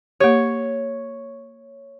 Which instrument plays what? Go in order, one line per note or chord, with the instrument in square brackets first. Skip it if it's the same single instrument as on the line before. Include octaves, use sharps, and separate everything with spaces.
[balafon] A#3 G4 [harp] C#5